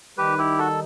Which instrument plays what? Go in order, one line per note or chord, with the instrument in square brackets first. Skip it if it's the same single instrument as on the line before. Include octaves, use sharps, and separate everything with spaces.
[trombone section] D#3 G3 D#4 [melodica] G4 B4
[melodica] E4 G4
F#4 A4